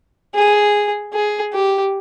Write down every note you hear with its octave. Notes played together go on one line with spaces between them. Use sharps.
G#4
G#4
G4